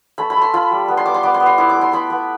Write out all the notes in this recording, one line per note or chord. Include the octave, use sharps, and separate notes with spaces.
A3 B5
B5
A3
C6
F4 B5
G3
B3
C6
B3 D6
C6
B3 D6
C6
B3
C6
E4 D6
D6
A3
C6
B3 B5
B3